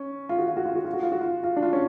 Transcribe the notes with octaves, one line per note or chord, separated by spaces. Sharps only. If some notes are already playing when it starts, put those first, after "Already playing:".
Already playing: C#4
F4
F#4
F4
F#4
F4
F#4
F4
F#4
F4
F#4
F4
F4
D4
F4
C#4